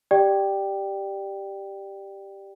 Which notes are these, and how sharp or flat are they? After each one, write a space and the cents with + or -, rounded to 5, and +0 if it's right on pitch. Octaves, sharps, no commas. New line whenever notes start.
G4 +0 D5 +15 G5 +0